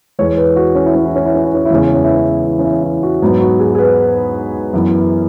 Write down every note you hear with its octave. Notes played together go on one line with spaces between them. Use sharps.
E2 E3 G#3 C#5
B4
F#4
C#4
E4
C#4
E4
C#4
E4
C#4
E4
C#4
E4
E2 C#3 G#3 B3 C#4
E4
C#4
E4
C#4
E4
C#4
E4
E4
F#4
G#2 F#3 B3
F#4
G#4
G#4
B4
F#2 E3 B3